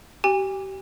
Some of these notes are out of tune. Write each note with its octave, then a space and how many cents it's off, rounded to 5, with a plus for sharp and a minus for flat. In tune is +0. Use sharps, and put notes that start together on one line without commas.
G4 -30 G#5 -40